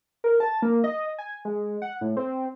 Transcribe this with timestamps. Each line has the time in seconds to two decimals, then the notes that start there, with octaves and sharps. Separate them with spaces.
0.24 A#4
0.40 A5
0.62 A#3
0.84 D#5
1.18 G#5
1.45 G#3
1.82 F#5
2.01 A2
2.17 C4